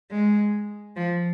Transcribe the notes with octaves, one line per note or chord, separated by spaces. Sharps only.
G#3
F3